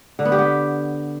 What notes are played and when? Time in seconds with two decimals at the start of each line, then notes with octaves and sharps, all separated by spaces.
0.19 D3
0.25 B3
0.32 G4
0.38 B3